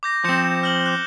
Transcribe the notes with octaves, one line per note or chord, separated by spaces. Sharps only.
D6 G6 A#6
F3 C4 G6 C#7 E7
F6 F#7 G7
D6 F#6